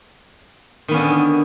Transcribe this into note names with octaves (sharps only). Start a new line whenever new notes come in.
D3 D#3 B3 C#4